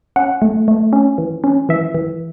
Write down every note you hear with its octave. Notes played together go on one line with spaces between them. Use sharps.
C#4 F#5
A3
A3
C#4
E3
C#4
E3 E5
E3